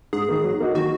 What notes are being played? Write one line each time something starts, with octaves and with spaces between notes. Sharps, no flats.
G#2 G#4
D#3 A#3
F#3
A#3 D#4 F#4
D#3 F#4